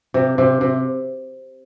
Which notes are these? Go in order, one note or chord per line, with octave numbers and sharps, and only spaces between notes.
C3
C3
C3